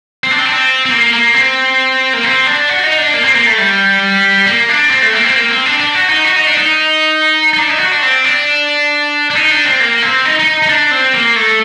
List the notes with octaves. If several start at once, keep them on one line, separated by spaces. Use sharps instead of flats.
C4
D4
C4
D4
C4
C4
A#3
A#3
C4
A#3
C4
D4
F#4
D#4
D4
A#3
C4
A#3
A3
G3
A#3
D4
C4
A3
A#3
C4
A#3
C4
D4
D4
F#4
D#4
F#4
D#4
D4
D#4
D#4
D4
D#4
F#4
D4
C4
D4
D4
D#4
D4
C4
A#3
C4
D#4
D#4
D#4
D4
C4
A#3
A3